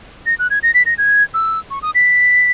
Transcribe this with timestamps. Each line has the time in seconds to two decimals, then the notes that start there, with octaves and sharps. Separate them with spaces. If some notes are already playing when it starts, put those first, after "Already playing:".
0.26 A#6
0.39 F#6
0.50 G#6
0.63 A#6
0.74 B6
0.86 A#6
0.98 G#6
1.34 E6
1.70 C#6
1.82 D#6
1.95 B6